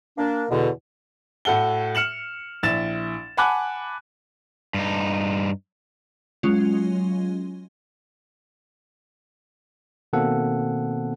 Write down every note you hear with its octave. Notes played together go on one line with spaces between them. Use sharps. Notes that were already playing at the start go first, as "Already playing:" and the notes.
A#3 D4
E2 B2 D3
A2 F#4 A4 F#5 G7
F6 C#7 E7 F#7
A#1 E4 A6 E7
F#5 G#5 A5 B5 D6 F#6
G2 D#4
F#3 G#3 C#4 F4
B2 D#3 A#3 C4 A4 F#5